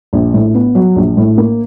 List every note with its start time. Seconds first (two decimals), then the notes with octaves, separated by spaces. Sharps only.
0.13 A#1
0.34 A2
0.54 B3
0.75 F#3
0.96 A#1
1.17 A2
1.38 A#3